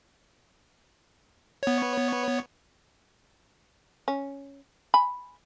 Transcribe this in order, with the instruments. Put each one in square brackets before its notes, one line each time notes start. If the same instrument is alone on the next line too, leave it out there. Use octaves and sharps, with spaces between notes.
[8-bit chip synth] B3 C#5
[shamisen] C#4
G#5 B5